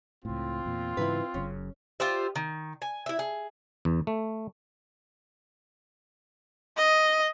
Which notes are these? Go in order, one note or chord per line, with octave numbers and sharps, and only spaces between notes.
C#2 A2 C4 F4
E2 A#2
G#2 C#3 E3 E4 B4
F#1 F#2 C#3 C#4
F4 G4 C5 E5
D#3
G#5
E4 E5
G#4
E2
A3
D#5